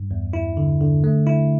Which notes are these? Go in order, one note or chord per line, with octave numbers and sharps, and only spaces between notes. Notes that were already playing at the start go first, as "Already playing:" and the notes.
Already playing: G2
E2
E4
D3
D3
A3
E4